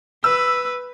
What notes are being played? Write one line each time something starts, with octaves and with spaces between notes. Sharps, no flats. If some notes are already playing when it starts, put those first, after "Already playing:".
B4 E6